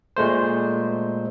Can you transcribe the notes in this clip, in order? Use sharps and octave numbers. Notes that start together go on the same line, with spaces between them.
A#2 G#3 A3 C5